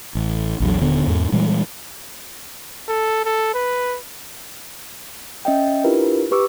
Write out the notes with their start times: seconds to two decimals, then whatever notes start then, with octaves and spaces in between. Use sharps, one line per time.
0.15 A1
0.60 A#1 E2 F#3
0.82 D#1 D3 B3
1.07 E2 G#2
1.32 A#2 E3 G3 G#3
2.88 A4
3.25 A4
3.54 B4
5.45 C#4 D#5 E5 G5
5.84 D4 E4 F4 G4 A#4 B4
6.31 G4 B4 C#6 D6 E6